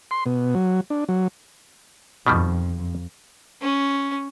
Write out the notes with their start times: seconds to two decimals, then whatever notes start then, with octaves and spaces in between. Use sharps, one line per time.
0.11 C6
0.26 B2
0.55 F#3
0.90 D4
1.09 F#3
2.26 F2 B2 D#3 G3
3.61 C#4